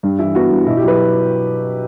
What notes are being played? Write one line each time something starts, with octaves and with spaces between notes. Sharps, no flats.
G2
E3 E4
B3 F#4
G2
B2 E4
G4
F#3 B4